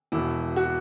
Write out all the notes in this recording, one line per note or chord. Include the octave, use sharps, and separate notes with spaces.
E1 E2 B2 E4
F#4